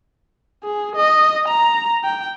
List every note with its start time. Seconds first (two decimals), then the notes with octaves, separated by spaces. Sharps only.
0.64 G#4
0.96 D#5
1.48 A#5
2.04 G5